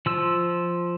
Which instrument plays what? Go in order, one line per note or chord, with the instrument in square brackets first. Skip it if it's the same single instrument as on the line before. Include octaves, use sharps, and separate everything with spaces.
[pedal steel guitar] F3 E6